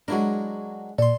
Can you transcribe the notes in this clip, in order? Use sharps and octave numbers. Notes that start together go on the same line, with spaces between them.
F#3 G#3 D4 E4 A#4
A#2 A4 D5 C6